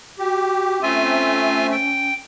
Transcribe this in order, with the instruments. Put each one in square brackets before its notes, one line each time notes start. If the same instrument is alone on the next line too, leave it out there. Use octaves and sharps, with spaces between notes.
[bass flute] F#4 [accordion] G4
[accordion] A3 C4 E5 [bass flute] C#4 [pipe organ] F4 G#5
[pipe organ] G5